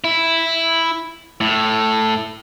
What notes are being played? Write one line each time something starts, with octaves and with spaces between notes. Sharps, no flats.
E4
A2